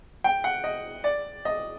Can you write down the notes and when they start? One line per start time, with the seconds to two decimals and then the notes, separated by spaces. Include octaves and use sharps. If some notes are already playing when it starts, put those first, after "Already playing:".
0.24 G5
0.44 F#5
0.64 D#5
1.04 D5
1.45 D#5